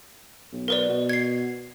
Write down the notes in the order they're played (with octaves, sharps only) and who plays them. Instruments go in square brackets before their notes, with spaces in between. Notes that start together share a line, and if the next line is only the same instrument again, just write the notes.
[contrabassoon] B1
[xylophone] A#4 B4 D5
[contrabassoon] B2
[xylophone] G#6 C7